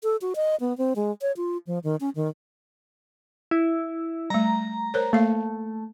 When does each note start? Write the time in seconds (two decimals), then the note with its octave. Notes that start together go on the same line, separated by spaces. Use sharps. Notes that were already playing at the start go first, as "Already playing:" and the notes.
0.03 A4
0.22 F#4
0.36 D#5
0.60 B3
0.78 C4
0.96 G#3
1.21 C#5
1.37 F4
1.67 F3
1.84 D#3
2.00 C#4
2.15 D#3
3.51 E4
4.30 G3 A3 A#5
4.94 A#4 C5 C#5
5.13 A3 A#3 F5